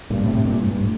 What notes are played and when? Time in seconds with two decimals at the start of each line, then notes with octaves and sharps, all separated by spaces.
0.10 G2 A#2
0.21 A2 C3
0.33 A2 C3
0.46 G2 A#2
0.63 G2
0.81 A2